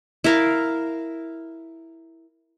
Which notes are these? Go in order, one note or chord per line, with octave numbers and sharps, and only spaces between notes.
E4 A#4 F5